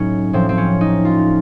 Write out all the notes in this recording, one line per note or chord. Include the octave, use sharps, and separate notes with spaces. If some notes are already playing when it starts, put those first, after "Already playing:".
Already playing: A2 F#3 C#4 D#4
A2 F3 C4
C4
C#4
D#4
F4